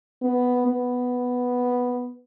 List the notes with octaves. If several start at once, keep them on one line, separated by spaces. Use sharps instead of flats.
B3
B3